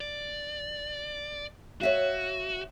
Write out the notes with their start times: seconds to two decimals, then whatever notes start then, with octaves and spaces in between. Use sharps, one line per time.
0.01 D5
1.81 F#4 C#5 E5 F5